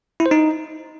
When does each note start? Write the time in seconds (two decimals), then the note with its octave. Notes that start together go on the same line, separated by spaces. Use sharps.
0.20 E4
0.26 C5
0.31 D#4